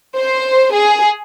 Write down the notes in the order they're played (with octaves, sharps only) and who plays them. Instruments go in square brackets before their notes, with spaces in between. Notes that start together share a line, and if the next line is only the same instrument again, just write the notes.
[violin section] C5
G#4